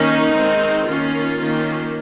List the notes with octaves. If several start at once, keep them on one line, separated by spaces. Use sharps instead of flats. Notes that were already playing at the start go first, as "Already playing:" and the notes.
Already playing: D#3 A#3 C#4 D#4
D#3 G#3 C4
D#3 A#3 C#4 F4
D#3 A#3 C#4